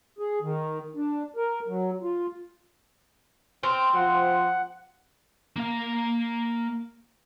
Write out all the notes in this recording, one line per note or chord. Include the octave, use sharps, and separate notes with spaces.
G#4
D#3
D4
A#4
F#3
F4
C4 G5 F6 G6
F3 F#5
A#3 F5